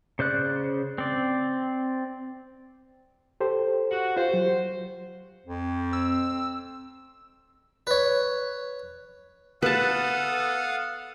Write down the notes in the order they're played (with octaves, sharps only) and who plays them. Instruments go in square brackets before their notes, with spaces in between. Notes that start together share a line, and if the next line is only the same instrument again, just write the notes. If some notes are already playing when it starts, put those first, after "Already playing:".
[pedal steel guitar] C#3 C5 D5 F#6
C4 D5
[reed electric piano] G4 A4 C5
[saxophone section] F#4
[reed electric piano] F4 G4 [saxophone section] C5
[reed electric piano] F#3
[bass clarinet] F2
[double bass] C4 [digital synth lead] E6
[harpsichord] B4 C#5
[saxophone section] B3 A4 [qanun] B4 A5 [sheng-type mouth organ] F5 F#5 D#6